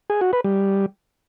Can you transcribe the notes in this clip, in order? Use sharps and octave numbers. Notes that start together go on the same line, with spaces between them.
G#4
F#4
B4
G3